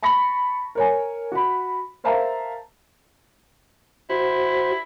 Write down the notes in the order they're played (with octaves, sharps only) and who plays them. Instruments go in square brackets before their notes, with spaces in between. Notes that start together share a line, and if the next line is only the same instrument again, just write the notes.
[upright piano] A5 B5 C#6 A#6
A#4 C#5 G#5
F#4 B5
A#4 C5 E5 F5 A5 A#5
[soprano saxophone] E4 [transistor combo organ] F#4 C5